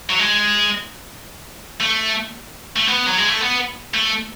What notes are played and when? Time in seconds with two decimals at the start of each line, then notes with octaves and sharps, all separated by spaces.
0.09 F#3
0.19 G#3
1.80 A3
2.76 A3
2.88 B3
3.07 F#3
3.18 G#3
3.29 A3
3.41 B3
3.94 A3